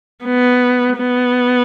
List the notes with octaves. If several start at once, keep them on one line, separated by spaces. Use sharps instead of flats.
B3
B3